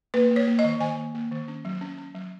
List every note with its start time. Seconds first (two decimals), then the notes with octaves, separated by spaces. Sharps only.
0.14 A#3 B4
0.31 A#3
0.36 C#5
0.47 A#3
0.59 D#5
0.64 D#3
0.81 D#3 G#5
0.98 A#3
1.15 A#3
1.31 D#3
1.48 C#4
1.65 F#3
1.81 C#4
1.98 C#4
2.15 F#3